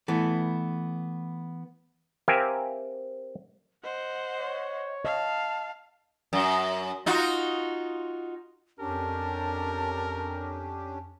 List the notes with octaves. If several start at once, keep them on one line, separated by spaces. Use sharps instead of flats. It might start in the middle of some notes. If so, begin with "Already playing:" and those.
E3 A3 B3
C4 G4 A#4 E5 F5 G#5
C5 D#5 F#5
C#5
D#5 F5 A5
F#2
D#4 F4 F#4
F2 C#4 D4 G4 A#4 A5